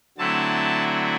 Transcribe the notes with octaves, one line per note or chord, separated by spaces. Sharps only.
D3 F#3 A3 C4 E4 A5